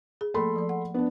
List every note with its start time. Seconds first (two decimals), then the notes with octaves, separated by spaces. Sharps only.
0.21 G#4
0.34 F3 A3 A#3 A4 B5 C6
0.56 F3 D5
0.69 F#5
0.94 B3 D4